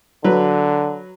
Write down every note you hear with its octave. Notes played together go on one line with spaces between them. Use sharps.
D3 F#3 B4